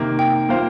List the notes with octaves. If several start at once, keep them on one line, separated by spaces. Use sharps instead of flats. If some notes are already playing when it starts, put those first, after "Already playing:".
Already playing: C3 D#3 A#3
G5
A#3 F4 C5 F5